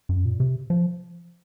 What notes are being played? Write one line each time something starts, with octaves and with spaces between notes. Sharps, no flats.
F#2
A#2
C3
F3